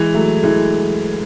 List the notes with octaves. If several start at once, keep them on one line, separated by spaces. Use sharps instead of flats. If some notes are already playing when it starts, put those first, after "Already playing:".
Already playing: E3 G#3
F#3 A3
E3 G#3